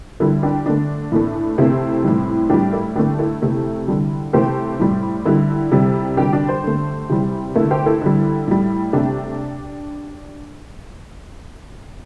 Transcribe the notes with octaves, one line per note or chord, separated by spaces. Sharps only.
D3 G3 E4 A4
D4 G4
D3 A3 D4
A2 E3 A3
C3 A3 C4 E4
A2 E3 G3
A2 G3 D4 G4
E4 A4
D3 A3 D4 G4
E4 A4
C3 A3
D3 G3
C3 E3 A3 G4 C5
A2 G3
D3 G3 E4 A4
C3 G3
D3 G3 D4 G4
D4 G4
G4 C5
D3 A3
C3 E3 G3
D3 A3 E4 A4
G4 C5
E4 A4
D3 G3
A2 G3
C3 A3 D4 G4